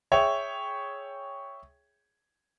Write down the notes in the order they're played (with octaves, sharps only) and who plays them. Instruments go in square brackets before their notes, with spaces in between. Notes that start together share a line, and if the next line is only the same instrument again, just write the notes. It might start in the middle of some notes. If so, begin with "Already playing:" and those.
[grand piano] G#4 C#5 E5 G5